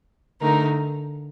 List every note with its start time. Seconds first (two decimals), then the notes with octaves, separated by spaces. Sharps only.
0.41 D3 A3 D#4 A#4